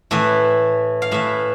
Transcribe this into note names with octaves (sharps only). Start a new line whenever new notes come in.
A2 E3 E5
F5
A2 E3 E5